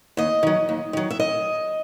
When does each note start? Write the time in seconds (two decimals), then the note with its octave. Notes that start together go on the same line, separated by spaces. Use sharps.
0.17 D#2 D#5
0.43 D#3 F#3
0.69 D#2
0.93 D#3 F#3
1.10 E5
1.20 D#5